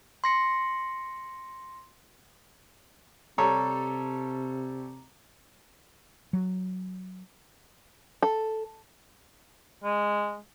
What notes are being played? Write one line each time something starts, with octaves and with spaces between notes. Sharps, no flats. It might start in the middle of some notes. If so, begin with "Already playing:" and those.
C6 A#6 C#7
C3 G3 A4 C#5 A#5
F#3
A4
G#3